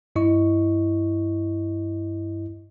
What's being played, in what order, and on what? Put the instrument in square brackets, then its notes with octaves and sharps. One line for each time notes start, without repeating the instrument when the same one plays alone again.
[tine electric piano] G2 E4 D#5 C#6